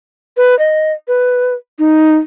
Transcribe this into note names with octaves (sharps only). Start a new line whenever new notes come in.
B4
D#5
B4
D#4